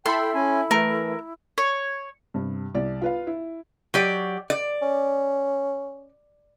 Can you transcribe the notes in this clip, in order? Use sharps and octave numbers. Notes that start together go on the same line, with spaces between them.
E4 A4 E5 G5 B5 C6
C#4 G#5
E3 A3 A#4
C#5
G2 C3
C2 D5
F4 B4 F5
E4
F#3 G4 D5
D5
C#4